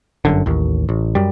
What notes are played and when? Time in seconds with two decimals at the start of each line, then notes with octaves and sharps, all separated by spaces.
0.25 G1 F#2 D3
0.46 A1 D#2
0.89 A1
1.15 F#2 G3